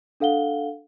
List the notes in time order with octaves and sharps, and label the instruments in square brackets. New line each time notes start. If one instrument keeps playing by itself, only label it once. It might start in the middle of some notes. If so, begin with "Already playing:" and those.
[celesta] D4 A4 F5 F#5 G7